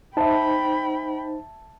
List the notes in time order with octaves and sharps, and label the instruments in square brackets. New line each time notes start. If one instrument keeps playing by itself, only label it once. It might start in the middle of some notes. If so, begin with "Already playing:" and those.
[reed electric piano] D#4 C5 [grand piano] E5 A5 [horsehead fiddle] G5 B5